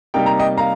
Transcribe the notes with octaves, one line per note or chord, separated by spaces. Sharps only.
C3 G3 A#3 D#4 G5
A#5
D#5 G5
F5 A#5